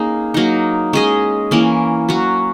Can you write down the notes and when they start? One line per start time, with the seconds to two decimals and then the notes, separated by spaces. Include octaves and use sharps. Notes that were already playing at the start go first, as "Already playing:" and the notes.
Already playing: A#3 C#4 D#4 G#4
0.34 F#3 A#3 D#4
0.93 G#3 C#4 G#4 D#5
1.51 E3 A#3 C#4
2.09 F#3 C#4 F#4